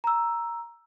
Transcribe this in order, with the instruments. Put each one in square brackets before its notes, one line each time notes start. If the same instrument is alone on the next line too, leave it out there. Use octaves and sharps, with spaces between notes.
[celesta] A#5 E6